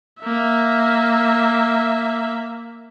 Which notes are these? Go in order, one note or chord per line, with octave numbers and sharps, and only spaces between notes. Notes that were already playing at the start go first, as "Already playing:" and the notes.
A#3 E5